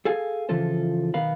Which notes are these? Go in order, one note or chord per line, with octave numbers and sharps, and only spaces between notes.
G#4 A4 F5 G#5
C#3 E3 F3 F4 A4 C5
B1 D#3 B3 A#4 F5 B5